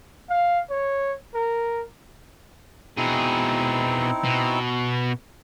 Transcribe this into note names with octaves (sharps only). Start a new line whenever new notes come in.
F5
C#5
A#4
B2 C4 D#4 E4 G#4
B2